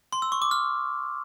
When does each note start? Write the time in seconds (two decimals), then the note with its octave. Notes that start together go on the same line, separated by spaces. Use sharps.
0.12 C6
0.22 E6
0.32 C#6
0.42 D6
0.51 F6